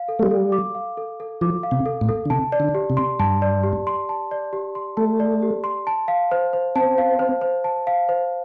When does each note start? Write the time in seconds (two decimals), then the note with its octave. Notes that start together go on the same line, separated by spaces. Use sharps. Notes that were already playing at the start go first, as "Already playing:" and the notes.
Already playing: F5
0.08 A4
0.19 A3
0.23 G3
0.31 A4
0.52 D6
0.75 F5
0.97 A4
1.20 A4
1.41 F3 D6
1.63 F5
1.71 C3
1.86 A4
2.01 A2
2.09 A4
2.25 D3
2.30 C3 A5
2.52 D5
2.60 D3
2.75 G4
2.90 C3
2.97 C6
3.20 G2 A5
3.42 D5
3.63 G4
3.87 C6
4.09 A5
4.31 D5
4.53 G4
4.75 C6
4.97 A3 A5
5.20 D5
5.42 G4
5.64 C6
5.87 A5
6.08 F5
6.31 C5
6.53 C5
6.75 C4 A5
6.98 F5
7.19 C5
7.41 C5
7.64 A5
7.87 F5
8.09 C5